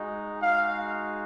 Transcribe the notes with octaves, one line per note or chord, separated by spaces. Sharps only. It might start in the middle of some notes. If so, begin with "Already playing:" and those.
Already playing: G#3 D#4 F#4
G#3 D#4 F#4 F5